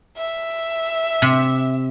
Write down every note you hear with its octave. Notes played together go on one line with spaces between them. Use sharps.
E5
C3